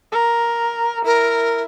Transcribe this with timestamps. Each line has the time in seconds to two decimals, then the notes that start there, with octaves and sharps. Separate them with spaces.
0.12 A#4
1.05 E4 A#4